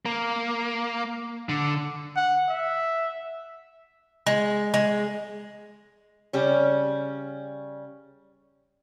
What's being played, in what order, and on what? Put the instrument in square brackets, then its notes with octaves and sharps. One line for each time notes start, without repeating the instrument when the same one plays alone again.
[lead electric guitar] A#3
D3
[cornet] F#5
E5
[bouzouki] G#3
G#3
[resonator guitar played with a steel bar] C#3 G3 C#4